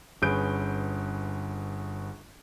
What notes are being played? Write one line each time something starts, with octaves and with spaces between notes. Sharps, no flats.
G1 C#4 G#4 B4 G6 D7